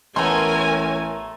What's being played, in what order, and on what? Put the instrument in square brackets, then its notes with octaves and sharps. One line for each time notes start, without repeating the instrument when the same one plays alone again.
[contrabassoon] A1 [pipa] A3 B3 [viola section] A#4 C#5 G#5 [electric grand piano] A#5 C6